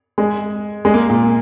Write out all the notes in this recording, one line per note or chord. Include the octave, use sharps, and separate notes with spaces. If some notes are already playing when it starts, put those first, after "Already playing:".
G#3
G#3
A#3
A#2